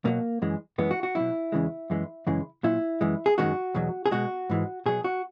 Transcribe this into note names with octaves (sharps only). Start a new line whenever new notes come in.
B2 F#3 A#3
F#2 E3 G#3
F#2 E3 G#3 B3
F#4
F#4
B2 F#3 E4
E2 C#3 E3 G#3
F#2 E3 G#3
F#2 C#3 E3 G#3
A#2 F#3 E4
F#2 E3 G#3
G#4
F#2 D#3 G#3 F#4
E2 B2 F#3
G#4
B2 G#3 F#4
G#2 E3 G#3
B2 F#3 G#4
F#4